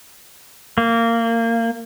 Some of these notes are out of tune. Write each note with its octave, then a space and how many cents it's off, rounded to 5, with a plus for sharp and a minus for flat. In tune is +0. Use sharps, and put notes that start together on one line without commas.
A#3 -20